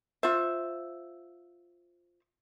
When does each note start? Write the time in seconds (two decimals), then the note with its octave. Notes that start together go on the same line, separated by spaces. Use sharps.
0.23 F4 C5 E5